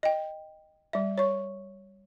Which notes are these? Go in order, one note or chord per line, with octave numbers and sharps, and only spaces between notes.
D#5 G5
G3 E5
C#5 C#6